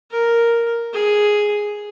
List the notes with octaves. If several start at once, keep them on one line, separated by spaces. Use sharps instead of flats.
A#4
G#4